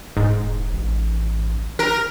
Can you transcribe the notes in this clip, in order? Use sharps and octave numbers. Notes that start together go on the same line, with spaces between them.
E1 G#2
A1
A#4